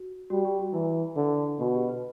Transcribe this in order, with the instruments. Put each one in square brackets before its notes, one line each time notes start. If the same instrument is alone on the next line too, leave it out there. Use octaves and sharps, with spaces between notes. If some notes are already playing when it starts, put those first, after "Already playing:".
Already playing: [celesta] F#4
[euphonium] G3 [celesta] F#4
[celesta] G4
F#4
[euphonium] E3 [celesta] E4
[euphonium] D3
[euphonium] B2 [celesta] F#4
[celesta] G4
B4